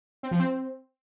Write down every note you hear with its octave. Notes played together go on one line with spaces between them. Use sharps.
C4
F3
C4